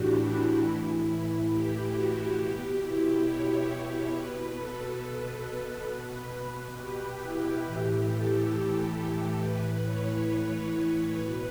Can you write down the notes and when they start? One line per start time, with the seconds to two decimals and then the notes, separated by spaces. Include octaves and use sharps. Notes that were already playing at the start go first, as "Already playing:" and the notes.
Already playing: A2 E3 D4 F#4 G4
0.17 E4
0.61 A2 E3
1.49 G4
1.93 F#4
2.37 B2 G4
2.80 E4
3.25 C#5
3.68 C#5
4.12 B2 B4
4.56 A4
5.01 B4
5.88 B2 B4
6.77 G4
7.20 E4
7.64 A2 E3 G4
8.08 A4
9.40 A2 E3 B4
9.84 C#5
10.29 B4
11.16 B2 B4